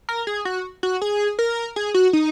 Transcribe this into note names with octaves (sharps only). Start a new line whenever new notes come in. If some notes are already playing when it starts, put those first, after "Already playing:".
A#4
G#4
F#4
F#4
G#4
A#4
G#4
F#4
D#4